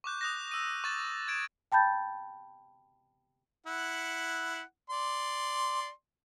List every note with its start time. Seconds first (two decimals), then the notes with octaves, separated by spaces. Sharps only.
0.04 C#6 D6 F#6 G6
0.21 D#6 F#6 A#6
0.51 E6 D#7
0.84 C#6 A6 E7
1.28 G#6 D7 E7
1.72 G5 A5 B5 G6 A6
3.66 E4 F#5
4.90 D5 C6